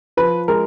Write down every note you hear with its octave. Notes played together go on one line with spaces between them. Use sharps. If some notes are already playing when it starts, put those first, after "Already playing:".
F3 B4
G#3 A#4